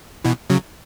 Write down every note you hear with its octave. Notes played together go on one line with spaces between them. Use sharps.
B2 E3
C#3 F#3